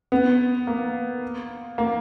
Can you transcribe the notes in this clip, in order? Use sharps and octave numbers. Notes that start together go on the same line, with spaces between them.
B3
A#3
A#3